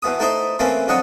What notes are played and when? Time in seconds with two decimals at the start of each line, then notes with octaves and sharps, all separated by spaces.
0.03 E2 B2 B3 D#6
0.19 A3 D#4 E4 C5 D#5
0.59 E3 A3 A#3 C4 C#4
0.88 F2 D3 F#3 D#5 C#6